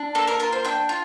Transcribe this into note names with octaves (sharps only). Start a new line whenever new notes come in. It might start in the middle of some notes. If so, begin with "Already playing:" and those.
Already playing: D4
A#3 A4
A#4
F4 A#4
C5
D4 G5
F4